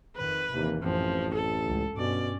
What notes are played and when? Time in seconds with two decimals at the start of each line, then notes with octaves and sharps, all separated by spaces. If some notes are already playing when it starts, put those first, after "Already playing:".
0.16 F2 D#3 B4
0.55 D#2 C3 E3 A#3
0.83 A1 F#2 F3 C4
1.34 A4
1.66 C#2
1.98 G2 B2 C#4 D5